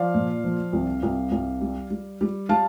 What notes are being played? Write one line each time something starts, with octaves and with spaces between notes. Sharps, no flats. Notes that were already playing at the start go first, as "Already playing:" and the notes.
Already playing: F3 D5 F5
A#2
F3
C2
C2
C2
G3
G3
G3
G3 F5 A5